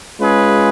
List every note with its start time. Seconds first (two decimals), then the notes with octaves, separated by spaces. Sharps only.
0.20 G#3 C#4 F4 G#4 B4